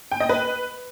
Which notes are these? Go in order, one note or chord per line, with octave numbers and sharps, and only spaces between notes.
G5
D#5
B4